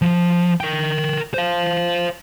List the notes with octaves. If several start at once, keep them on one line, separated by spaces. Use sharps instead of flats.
F3
A#4 G5
C5 F5